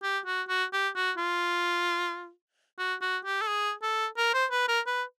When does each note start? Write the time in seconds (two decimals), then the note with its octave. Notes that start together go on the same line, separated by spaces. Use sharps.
0.03 G4
0.26 F#4
0.48 F#4
0.73 G4
0.95 F#4
1.17 F4
2.78 F#4
3.02 F#4
3.25 G4
3.42 A4
3.48 G#4
3.82 A4
4.17 A#4
4.34 C5
4.51 B4
4.68 A#4
4.86 B4